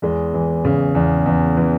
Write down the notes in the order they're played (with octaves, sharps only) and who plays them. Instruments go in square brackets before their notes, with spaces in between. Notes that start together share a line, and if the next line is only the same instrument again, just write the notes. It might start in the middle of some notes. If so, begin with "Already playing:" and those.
[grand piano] E2 G#3
E3
C#3
E2
E2
E3